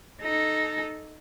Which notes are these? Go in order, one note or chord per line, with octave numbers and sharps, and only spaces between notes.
D#4 A4